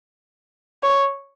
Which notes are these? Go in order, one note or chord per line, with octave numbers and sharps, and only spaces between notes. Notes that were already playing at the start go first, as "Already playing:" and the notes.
C#5